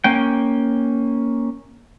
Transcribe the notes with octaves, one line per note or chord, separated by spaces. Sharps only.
A#3 C#4 G5